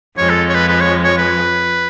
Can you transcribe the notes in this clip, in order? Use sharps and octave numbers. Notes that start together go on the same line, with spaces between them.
F2 F3 G#3 C#5
A4
C#5
B4
B4
C#5
C#5
B4